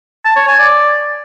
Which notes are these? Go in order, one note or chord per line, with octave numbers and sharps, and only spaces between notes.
A5
C#5
G#5
D5